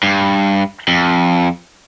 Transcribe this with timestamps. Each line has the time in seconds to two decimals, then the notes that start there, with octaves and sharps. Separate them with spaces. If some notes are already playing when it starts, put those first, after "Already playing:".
0.03 G2
0.88 F2